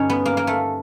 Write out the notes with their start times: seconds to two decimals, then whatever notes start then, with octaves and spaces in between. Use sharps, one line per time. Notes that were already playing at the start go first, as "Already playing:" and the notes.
Already playing: G2 D3 G3 C#4 D#4
0.10 B3
0.26 A#3
0.37 A#3
0.47 A3